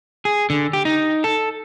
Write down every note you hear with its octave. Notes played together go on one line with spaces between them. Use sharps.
G#4
D3
G4
D#4
A4